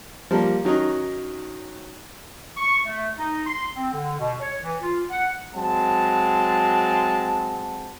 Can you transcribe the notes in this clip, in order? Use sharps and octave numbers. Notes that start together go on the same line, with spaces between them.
F3 G3 A#3
D#3 F#3 C#4 D#4
C#6
A3
D#4
C6
C4
D3
B2
C#5
E3
F4
F#5
F#3 G#3 C4 F#5 A5